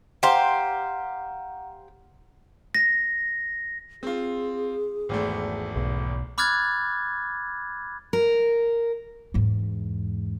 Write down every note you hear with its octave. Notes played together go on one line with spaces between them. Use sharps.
G4 C5 F5 F#5 A#5
A#6
C4 F4 G#4
G#1 E2 A3
B1
B5 D6 F6 F#6 G#6 A6
A#4
E2 G#2